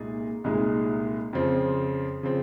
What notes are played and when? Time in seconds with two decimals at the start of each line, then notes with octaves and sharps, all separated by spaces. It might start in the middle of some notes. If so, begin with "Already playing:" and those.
Already playing: C2 A#2 G#3 D#4 G#4
0.44 C2 A#2 G#3 D#4 G#4
1.33 F2 C#3 F3 C4
2.23 C#3 F3 C4